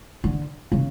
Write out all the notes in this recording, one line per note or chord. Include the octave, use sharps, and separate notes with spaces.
D3
C#3